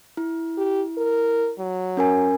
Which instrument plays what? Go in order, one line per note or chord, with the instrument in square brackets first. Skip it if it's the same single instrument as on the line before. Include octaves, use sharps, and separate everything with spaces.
[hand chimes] E4
[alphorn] G4
A#4
F#3
[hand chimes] C#4 A#4 G#5